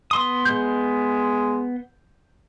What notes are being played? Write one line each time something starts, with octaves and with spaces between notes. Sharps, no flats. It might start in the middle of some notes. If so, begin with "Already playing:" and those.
B3 C6 D#6
G#3 G6